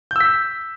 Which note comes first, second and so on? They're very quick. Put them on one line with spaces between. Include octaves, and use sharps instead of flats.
G6 E6 B6